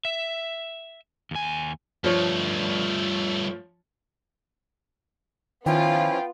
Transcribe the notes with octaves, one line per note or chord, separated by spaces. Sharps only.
E5
D#2 G#5
G2 F3 A3 C#5
D#3 F3 B3 C#4 E4 F4 B4 G5